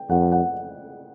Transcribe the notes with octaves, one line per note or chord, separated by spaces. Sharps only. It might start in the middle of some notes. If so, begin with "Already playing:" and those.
Already playing: G5
F2 F#5
F#5